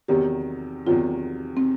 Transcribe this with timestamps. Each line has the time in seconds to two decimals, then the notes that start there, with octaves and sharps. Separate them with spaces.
0.08 E2 C3 D#3 F#3 G4
0.86 E2 C3 D#3 F#3 F4
1.57 C4